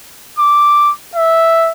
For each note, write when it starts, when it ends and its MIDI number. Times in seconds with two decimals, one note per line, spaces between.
0.39 0.91 86
1.16 1.72 76